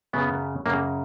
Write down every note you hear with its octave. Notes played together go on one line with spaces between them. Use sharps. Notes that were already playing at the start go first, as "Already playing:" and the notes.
F#2 C#3 F#3 B3
F#2 C#3 F#3 A#3